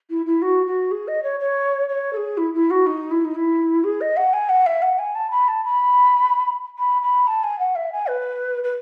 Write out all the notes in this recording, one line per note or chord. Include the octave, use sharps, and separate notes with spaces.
E4
E4
F#4
F#4
G#4
D#5
C#5
C#5
C#5
A4
G#4
E4
E4
F#4
D#4
E4
D#4
E4
G#4
D#5
F#5
G#5
F#5
E5
F#5
G#5
A5
B5
A5
B5
B5
B5
A5
G#5
F#5
E5
G#5
B4
B4